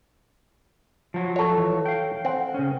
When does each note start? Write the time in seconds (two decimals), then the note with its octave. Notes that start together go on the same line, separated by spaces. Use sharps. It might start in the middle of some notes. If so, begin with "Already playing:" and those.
1.14 F3 F#3
1.36 A4 C#5
1.58 E3
1.86 F5 G5
2.25 C4 F#5
2.54 C#3 C#4